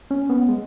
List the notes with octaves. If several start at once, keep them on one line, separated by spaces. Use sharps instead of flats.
C#4
B3
G#3